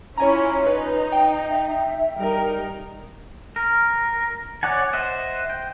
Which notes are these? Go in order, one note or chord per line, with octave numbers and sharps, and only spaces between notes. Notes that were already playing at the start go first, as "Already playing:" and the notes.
C#4 E4 F4 C#5 G#5 A#5
D#4 B4
G5
E5
G3 D#4 A#4
A#4
C#5 D5 F#5 G#5
C5 D#5 E5 F#5
G5